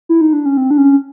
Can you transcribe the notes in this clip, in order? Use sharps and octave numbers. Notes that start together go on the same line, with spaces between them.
E4
D#4
D4
C#4
C4
D4
C#4